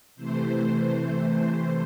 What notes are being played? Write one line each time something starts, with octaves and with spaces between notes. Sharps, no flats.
C3 E3 A3 C5